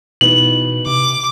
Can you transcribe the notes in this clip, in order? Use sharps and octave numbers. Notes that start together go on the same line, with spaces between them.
B2 E3 B3 D#4 F#7
C3 D6